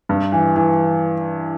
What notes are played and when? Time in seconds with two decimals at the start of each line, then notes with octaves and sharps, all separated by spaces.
0.09 G2
0.32 E3
0.56 E3